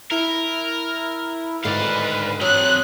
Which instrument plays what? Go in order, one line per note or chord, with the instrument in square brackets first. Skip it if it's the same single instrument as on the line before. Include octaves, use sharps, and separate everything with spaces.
[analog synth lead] E4 [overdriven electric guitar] A#4
[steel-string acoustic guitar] D2 D3 D#3 [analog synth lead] G#2 [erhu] B4 [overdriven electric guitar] D5 F5
[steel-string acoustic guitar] F#3 [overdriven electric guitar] C4 D#5 [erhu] F#6